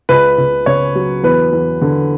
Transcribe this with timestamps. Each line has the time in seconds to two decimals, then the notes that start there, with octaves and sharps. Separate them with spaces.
0.09 C#2 B4
0.38 C#2
0.66 C#3 C#5
0.95 F#3
1.24 E2 B4
1.53 E2
1.82 D3